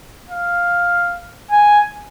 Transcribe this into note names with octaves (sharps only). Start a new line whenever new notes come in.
F5
G#5